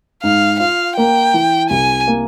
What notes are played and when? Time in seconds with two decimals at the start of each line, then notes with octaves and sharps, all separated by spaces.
0.23 G#2 F5
0.60 F4 F5
0.96 A#3 G5
1.34 E3
1.70 C2 G#5
2.08 A#3